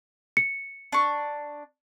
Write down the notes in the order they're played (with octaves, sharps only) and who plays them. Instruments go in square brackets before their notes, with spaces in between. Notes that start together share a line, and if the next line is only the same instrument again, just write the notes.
[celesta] C#7
[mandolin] D4 C#6